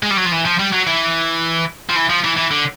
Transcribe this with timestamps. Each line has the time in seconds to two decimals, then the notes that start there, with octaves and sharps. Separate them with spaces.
0.03 G#3
0.11 G3
0.17 F#3
0.26 F3
0.32 E3
0.45 F3
0.59 G3
0.73 F#3
0.87 E3
1.89 F3
1.96 E3
2.09 F3
2.24 E3
2.37 E3
2.51 D3